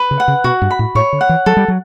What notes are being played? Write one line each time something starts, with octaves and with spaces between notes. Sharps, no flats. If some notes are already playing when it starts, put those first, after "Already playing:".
Already playing: B4
C#3
F#5
C#3
B2 F#4
G2
B5
A2
A2 C#5
D3
F#5
E3
F#3 A4
G3
F#3